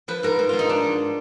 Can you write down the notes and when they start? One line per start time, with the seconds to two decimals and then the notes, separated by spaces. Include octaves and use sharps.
0.08 F3 B4
0.23 G#2 A#4
0.39 G#2
0.49 G#2 F4
0.59 D#4
0.69 F3 D4
0.84 G#2